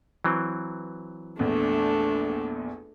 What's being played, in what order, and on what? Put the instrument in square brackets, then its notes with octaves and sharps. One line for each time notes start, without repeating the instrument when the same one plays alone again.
[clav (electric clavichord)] E3 F#3 C4
[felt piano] A#1 E2 [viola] A3 D4